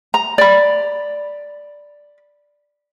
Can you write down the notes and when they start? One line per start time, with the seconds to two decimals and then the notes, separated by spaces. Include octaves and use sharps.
0.14 A#5
0.38 D5 B5